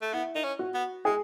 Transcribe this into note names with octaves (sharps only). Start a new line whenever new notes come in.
A3
B3 E4
D#4
C#4
F#4
B3
G#3 G#4